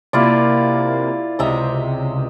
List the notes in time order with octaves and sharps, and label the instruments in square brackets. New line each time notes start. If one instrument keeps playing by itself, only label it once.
[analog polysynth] C3 A#3 [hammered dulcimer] E4 F4 D5
[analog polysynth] C#2 C3 [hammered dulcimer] D#5 E5 A#5